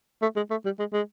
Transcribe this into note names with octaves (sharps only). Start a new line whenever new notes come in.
A3
G#3
A3
G3
G#3
G#3